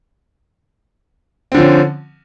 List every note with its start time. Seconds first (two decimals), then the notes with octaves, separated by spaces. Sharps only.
1.52 C4
1.54 D3
1.57 F3
1.60 C#4